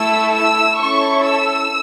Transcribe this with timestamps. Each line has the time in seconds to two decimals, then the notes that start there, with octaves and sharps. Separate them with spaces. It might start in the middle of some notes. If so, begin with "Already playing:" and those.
Already playing: A3 E4 A4 E6
0.34 E6
0.79 C#4 E4 A4 C#6
1.25 E6